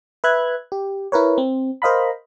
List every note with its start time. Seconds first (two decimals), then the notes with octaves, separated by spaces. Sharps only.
0.24 B4 E5 F#6 G#6
0.72 G4
1.12 E4 A#4 B4 C#5
1.38 C4
1.82 A#4 C5 D#5 F5 A#5 B5